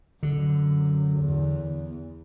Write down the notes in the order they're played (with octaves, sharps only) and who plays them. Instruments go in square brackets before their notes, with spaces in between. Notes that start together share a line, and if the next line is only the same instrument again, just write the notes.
[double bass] F#2 [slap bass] D3
[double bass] E2